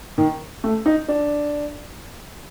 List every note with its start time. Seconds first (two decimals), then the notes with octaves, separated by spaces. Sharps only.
0.18 D#3
0.64 A3
0.86 D#4
1.08 D4